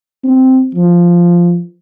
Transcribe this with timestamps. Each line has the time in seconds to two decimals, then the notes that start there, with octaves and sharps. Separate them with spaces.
0.24 C4
0.74 F3